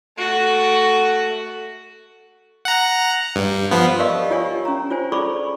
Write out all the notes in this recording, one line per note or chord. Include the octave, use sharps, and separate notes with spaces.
A3 F#4
F#5 A#5
G2
F3 B3
G4 A#4 D5 D#5 F5 C#6
F4 G4 C#5 G#5 C#6
C#4 A#5
F4 C5 C#5 G#5
G#4 A4 D5 B5 C#6 D6